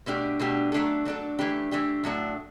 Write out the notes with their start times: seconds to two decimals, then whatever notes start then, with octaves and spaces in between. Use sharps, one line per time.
0.06 B2 A3 D4 G4
0.39 B2 A3 D4 G4
0.72 F#3 A3 D4 A4
1.05 F#3 A3 D4 A4
1.39 E3 A3 D4 G4
1.71 E3 A3 D4 G4
2.04 A2 F#3 A3 D4